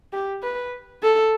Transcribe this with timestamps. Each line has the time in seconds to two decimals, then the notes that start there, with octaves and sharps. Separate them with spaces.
0.13 G4
0.43 B4
1.03 A4